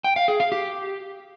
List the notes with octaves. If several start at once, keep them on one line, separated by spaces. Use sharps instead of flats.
G5
F5
G#4
F5
G4